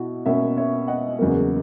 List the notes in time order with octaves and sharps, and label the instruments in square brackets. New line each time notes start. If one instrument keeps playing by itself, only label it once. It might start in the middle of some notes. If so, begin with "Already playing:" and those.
Already playing: [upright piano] B2 E4 F#4
B2 A#3 C#4 C#5 E5
C#5 E5
D#5 F#5
E2 C#3 F#3 A#3